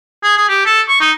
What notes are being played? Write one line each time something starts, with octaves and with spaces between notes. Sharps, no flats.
G#4
G#4
G4
A4
C#6
D#4